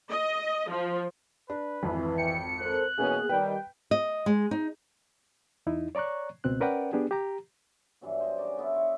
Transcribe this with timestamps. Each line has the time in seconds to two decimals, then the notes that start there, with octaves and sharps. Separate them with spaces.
0.11 D#5
0.71 F3
1.50 D4 B4
1.83 G#1 F2 E3
2.18 G5 C#7
2.60 A4 A#4 C5 F#6
2.98 B2 E3 A#3 B3 C#4 G#4
3.29 D#3 G3 B4 G5
3.91 D#5
4.26 G#3
4.51 D#4
5.67 E2 D#4 E4
5.95 C#5 D5 A#5 C#6 F#6
6.44 C#2 B2 C4 F#6
6.60 C#4 A#4 B4 D5 F#5 G5
6.93 B3 D4 G4 G#4
7.11 G4 A#5
8.01 G2 E3 F#3 B3
8.20 C5 D#5
8.38 C#4 F#4 A#4 D5
8.57 D3 B3 E4 F4
8.72 C#5 E5 D6